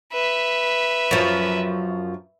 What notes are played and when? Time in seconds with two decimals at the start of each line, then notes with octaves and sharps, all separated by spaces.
0.13 B4 E5
1.11 F#2 F3